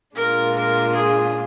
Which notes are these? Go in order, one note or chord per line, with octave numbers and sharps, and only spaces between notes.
A#2 G#3 D4 F4 A#4
A#4
G#4